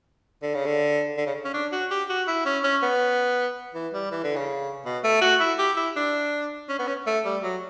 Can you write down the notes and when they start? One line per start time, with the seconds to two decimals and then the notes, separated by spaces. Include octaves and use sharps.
0.42 D3
0.55 C#3
0.65 D3
1.17 D3
1.26 C#3
1.45 C#4
1.53 D4
1.72 F#4
1.91 G4
2.09 F#4
2.28 E4
2.45 C#4
2.63 C#4
2.83 B3
3.75 E3
3.93 G3
4.11 E3
4.24 D3
4.36 C#3
4.85 B2
5.04 A3
5.21 F#4
5.40 E4
5.59 G4
5.77 E4
5.96 D4
6.69 C#4
6.79 B3
6.87 C#4
7.07 A3
7.25 G3
7.43 F#3